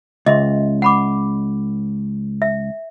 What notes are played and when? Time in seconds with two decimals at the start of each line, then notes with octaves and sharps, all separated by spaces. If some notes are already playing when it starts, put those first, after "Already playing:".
0.26 C#2 D#5 E5 C6
0.82 F#5 B5 D6
2.42 E5